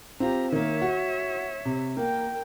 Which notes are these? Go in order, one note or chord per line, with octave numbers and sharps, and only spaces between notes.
C4 F4 G4 A#5
D#3 A#3 C#5 E5
F#4
C3
A#3 A#4 G5